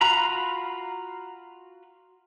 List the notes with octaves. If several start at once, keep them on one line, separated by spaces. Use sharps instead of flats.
F4 F#4 F5 A#5 B5